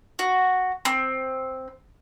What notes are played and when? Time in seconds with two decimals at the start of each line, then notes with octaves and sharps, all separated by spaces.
0.19 F#4
0.85 C4